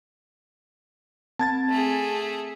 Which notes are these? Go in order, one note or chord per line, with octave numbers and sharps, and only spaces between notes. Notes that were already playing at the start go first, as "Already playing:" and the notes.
C4 A5 G#6 A6
A3 G#4